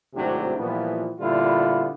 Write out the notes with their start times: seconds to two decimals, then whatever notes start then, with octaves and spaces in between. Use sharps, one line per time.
0.14 G#1 A2 C3 F#3 D4 G4
0.58 A#2 E3 F3 G3 B3
1.19 A#2 D3 G3 B3 E4 F4